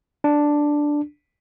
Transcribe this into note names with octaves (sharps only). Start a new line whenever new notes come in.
D4